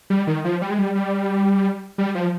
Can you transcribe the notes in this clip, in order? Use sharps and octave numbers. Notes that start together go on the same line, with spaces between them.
G3
D#3
F3
G3
G#3
G3
G3
G3
F3